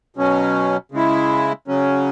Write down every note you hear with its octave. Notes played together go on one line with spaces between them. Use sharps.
B2 F#3 C#4
C#3 G#3 E4
C#3 F#3 C#4